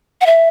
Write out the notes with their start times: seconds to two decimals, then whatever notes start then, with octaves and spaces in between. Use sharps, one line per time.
0.21 F#5
0.26 E5